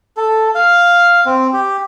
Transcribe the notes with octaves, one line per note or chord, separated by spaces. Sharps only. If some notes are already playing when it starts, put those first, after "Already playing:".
A4
F5
C4
G4